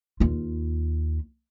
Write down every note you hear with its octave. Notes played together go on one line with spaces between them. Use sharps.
D#2 F4